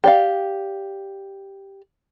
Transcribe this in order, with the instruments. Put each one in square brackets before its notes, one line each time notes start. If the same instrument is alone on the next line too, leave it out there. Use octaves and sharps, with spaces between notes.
[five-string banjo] G4 D5 F5